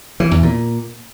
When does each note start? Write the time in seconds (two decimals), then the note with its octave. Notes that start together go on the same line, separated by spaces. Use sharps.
0.20 E3
0.31 E2
0.43 A#2